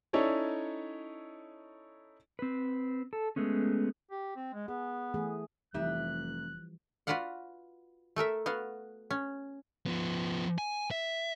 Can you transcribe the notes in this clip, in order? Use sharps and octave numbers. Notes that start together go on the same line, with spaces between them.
C#4 D#4 E4 A4 C#5 D5
C4 B4
A4
G#3 A3 B3 C#4
G4
C4
G#3
B3 G#4
E3 A3 G#4
F1 E3 F3 G3 D#4 G4 E5 F#6
F4 F#4 B4 D5 F5 F#5
A3 A4 A#4 E5
B3 F#4 F5
C#4
F3 B3
G#5
E5